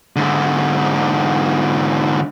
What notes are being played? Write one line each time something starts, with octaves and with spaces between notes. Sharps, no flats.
G#2 D3